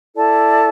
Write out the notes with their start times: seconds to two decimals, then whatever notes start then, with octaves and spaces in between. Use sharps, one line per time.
0.13 E4 A4 D5 A5